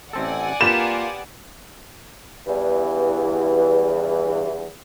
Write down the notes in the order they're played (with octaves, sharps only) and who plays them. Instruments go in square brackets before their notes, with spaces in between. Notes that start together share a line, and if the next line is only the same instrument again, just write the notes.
[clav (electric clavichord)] A1 C4 A4 [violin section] D5 F#5 G#5
[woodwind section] A#3 F4 [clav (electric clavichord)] G4 B4 [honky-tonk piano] E7
[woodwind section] E2 G2 E3